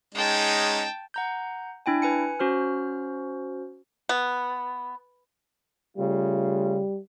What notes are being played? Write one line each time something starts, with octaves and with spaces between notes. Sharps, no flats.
G#3 C#4 D#4 G5 A5
F#5 A#5 G6
D4 E4 G5 G#5
B4 G#5 C#7
C#4 F#4 C5 F6
B3
C#3 G3 A3 F4